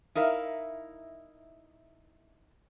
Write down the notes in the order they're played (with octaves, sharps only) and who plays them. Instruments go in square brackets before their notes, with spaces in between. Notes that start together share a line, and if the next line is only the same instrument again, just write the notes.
[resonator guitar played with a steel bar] D#4 E4 A#4 E5 F5